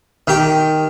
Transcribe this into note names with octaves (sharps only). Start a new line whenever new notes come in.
D#3 G4